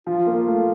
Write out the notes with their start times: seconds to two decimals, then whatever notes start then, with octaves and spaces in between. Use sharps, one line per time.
0.06 F3 F4
0.26 A#3
0.47 A3